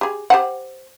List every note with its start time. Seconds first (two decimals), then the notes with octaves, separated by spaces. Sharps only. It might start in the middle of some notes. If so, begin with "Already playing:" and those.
0.01 G4 G#4
0.30 G4 C5 F#5